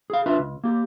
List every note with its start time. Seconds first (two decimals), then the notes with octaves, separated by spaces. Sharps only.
0.10 G#4 F5
0.26 D4 F4 B4 E5
0.39 C#2
0.64 A#3 G4